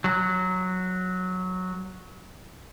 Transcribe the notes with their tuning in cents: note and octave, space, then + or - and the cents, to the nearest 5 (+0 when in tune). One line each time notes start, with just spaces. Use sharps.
F#3 -5